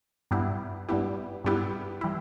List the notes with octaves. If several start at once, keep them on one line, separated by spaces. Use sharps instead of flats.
G2 G3 B3 E4 G4
G2 G3 B3 E4 G4
G2 G3 B3 E4 G4
E3 G3 E4